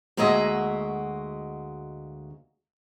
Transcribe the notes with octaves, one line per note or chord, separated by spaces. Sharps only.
D2 G#3 A#3 F#4 D#5 E5